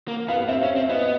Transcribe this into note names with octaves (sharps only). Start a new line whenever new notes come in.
A#3
B3 F5
C4 E5
C#4
C4
E5
B3 D#5